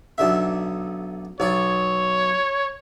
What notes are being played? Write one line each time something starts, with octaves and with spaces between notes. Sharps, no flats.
B1 D3 E5
B1 C#5 D5